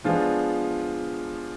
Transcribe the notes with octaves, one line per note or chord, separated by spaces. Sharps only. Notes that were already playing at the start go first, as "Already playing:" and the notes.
F3 G#3 B3 D4 F4